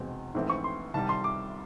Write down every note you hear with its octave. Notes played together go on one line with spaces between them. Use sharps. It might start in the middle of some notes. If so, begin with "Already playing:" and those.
Already playing: F1 E2 B2 G#3 C4
A#1 G#2 E3 A3 C4
C#6
C6
C2 C3 D#3 G3 A5
C6
D6